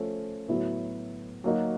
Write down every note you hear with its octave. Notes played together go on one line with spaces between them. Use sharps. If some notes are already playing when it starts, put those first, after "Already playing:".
Already playing: F3 A3 C#4
A2 F#3 B3 E4
F#3 A#3 D#4 F#4